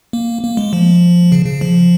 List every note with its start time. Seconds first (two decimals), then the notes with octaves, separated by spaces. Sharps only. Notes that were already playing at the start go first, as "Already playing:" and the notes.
0.13 A#3
0.43 A#3
0.57 G#3
0.73 F3
1.32 C#3
1.46 C#3
1.61 F3